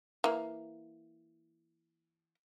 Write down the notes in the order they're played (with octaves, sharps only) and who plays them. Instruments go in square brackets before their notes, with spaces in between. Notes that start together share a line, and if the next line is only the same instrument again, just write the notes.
[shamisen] E3 A#3